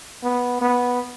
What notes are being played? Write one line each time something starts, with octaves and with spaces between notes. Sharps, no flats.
B3
B3